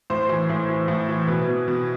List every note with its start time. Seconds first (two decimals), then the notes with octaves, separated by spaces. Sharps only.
0.10 A2 C5
0.29 E3
0.49 A2
0.69 E3
0.88 A2
1.09 E3
1.27 B2 B4
1.47 B2
1.68 B2